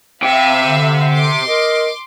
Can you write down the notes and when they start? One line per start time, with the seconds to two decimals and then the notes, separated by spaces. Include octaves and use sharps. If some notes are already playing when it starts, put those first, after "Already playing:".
0.22 C3 E5 F5 G5 B5
0.66 D3
1.10 C6 D6
1.47 A#4 D#5